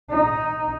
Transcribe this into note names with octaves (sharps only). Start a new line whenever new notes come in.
D#4